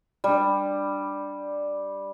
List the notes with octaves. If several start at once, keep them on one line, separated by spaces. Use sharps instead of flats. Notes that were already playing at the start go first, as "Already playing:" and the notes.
G3 D4